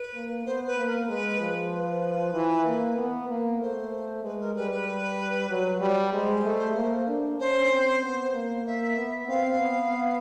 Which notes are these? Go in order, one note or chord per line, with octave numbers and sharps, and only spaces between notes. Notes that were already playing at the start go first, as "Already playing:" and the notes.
Already playing: B4
A#3
B3 C5
B4
A#3
A#4
G#3 B4
F3
B4
E3
A#3
B3
A#3
A3 C5
G#3 B4
A#4
G3 B4
B4
F#3
G3
G#3 C5
A3
A#3
D4
C#4 C5
C4
B3
A#3
A#3 E5
B3
C4 F5
B3